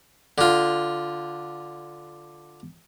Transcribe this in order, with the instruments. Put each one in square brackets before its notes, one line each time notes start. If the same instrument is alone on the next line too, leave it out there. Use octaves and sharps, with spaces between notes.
[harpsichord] D3 F4